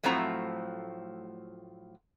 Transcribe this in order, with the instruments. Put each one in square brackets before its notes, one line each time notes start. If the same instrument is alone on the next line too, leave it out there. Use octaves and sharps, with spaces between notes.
[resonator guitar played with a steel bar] A2 F3 F#3 A3 C4 A#5